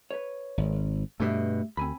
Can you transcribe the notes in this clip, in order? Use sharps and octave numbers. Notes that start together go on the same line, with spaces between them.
B4 C#5
G#1
G2 B2 A3 G4 E5
D2 C4 G#5 B5